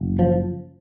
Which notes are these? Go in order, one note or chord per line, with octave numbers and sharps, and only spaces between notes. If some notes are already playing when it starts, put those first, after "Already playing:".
Already playing: F#1
F3